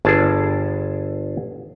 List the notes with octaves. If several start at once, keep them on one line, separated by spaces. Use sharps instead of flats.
G1 G#4 D5 A5